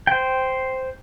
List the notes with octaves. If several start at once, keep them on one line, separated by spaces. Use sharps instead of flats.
C5 G5